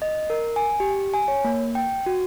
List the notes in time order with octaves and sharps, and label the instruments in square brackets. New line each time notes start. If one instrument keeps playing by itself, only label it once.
[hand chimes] D#5
A#4
G#5
G4
G#5
C#5
A#3
G5
F#4